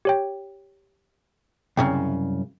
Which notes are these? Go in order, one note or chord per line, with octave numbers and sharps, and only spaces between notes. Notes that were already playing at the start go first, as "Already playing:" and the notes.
G4 C#5 G5
C2 F#2 C#3 G5